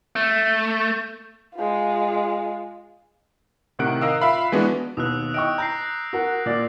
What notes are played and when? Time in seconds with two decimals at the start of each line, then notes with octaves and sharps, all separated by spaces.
0.16 A3
1.55 G#3 F4
3.79 A2 C3 D#3 F#5 F#6 D7
4.02 A#4 D#5 F5 E6
4.21 F4 E5 F5 B5
4.52 E3 G#3 B3 D4 F#4
4.97 D#2 B2 D#6 E6 F#6
5.34 D#5 G5 C#6 D7
5.58 A#5 G6 A#6 C7
6.13 F#4 A#4 F#5
6.46 A#2 D5